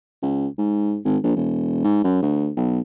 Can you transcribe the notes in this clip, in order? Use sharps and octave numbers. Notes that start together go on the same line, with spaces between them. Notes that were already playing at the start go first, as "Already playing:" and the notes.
C#2
G#2
G#1
A#1
E1
G#2
F#2
D2
B1